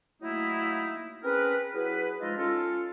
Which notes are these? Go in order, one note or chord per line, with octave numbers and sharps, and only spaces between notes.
F#3 A3 A#3 D#4 E4
C4 C#4 G#4 A#4 B4
F#3 E4 G#4 B4
F3 G#3 D#4 F4 A4 D#5
C#4 F4 A4